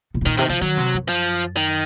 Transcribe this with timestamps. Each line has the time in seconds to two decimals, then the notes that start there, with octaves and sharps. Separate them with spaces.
0.14 A#2
0.21 G#2
0.26 A#2 D#3
0.38 C3 D#3
0.49 C#3 F3
0.61 D#3 F#3
0.77 C3
0.94 F#2
1.09 F3
1.56 D#3